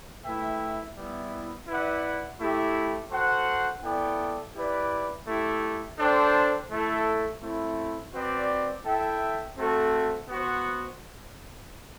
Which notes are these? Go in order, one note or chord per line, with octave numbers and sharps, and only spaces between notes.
A3 E4 B4 E5 G5
G3 B3 E4
E4 B4 D5 F#5
A3 E4 G4
F#4 A4 C5 F#5
B3 E4 A4 D5 G5
E4 G4 B4 D5
A3 E4 G4
D4 A4 C5 G5
A3 E4 A4
A3 C4 E4
C4 F#4 B4 D5
E4 A4 E5 G5
A3 C4 F#4 A4
B3 F#4 C5